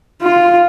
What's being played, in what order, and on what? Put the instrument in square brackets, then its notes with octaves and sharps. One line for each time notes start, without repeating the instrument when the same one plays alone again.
[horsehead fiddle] F4